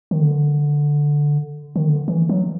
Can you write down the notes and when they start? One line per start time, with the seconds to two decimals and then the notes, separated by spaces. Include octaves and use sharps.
0.11 D#3
0.21 D3
1.76 D#3
1.87 D3
2.08 E3
2.29 F#3